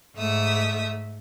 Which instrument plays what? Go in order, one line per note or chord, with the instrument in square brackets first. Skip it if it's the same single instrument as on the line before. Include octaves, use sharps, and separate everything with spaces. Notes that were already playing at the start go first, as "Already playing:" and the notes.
[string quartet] G#2 A3 E5 D#6